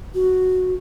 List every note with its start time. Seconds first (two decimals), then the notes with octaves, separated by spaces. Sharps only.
0.15 F#4